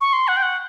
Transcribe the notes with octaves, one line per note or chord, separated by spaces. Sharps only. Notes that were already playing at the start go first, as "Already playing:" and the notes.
C#6
C6
F#5
G5
F#5